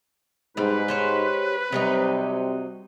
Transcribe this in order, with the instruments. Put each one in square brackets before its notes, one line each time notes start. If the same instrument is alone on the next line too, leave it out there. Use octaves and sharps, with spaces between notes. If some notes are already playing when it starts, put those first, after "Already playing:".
[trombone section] G#2 [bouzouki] G3 C4 [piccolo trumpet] B4
[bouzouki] G4 C5 C#5
[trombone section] C3 G3 [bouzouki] F#3 C4 D#4